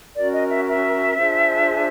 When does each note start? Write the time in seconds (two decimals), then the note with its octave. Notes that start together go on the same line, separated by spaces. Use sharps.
0.15 C#4 F#4 A#4 D5
0.33 D#5
0.49 E5
0.66 E5
1.17 D4 F4 G#4 C5